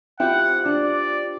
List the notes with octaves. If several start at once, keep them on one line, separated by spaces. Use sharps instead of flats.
C4 E4 F4 G4 C5 F#5 G5
D4 D5